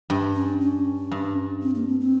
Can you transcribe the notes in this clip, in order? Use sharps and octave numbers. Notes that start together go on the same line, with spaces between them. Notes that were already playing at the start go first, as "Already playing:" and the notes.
G2
C#4
C#4
G2
C4
A#3
C4
C4